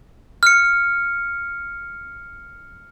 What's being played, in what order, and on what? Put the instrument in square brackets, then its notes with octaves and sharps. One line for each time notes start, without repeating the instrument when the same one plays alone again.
[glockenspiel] F6 C#7